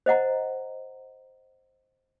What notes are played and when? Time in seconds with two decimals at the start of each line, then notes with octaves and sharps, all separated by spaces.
0.06 C5 D#5 F#5 A#5